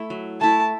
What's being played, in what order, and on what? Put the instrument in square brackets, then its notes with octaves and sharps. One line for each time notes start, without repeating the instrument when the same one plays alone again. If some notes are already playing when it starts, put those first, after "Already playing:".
Already playing: [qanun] A3 E4
F#3
[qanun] A3 E4 [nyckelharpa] A5